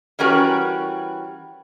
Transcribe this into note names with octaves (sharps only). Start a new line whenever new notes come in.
E3 G3 C#4 F#4 A#4 B4